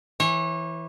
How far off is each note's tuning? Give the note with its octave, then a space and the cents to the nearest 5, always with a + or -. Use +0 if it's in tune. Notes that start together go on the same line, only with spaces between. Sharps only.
E3 +0 C#5 -35